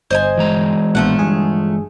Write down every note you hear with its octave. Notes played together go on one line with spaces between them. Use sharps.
G1 C5 D#5 G#5
E3 G#3 A#5
A#1 B2 F3 A3 F#5
G1 G2 G#4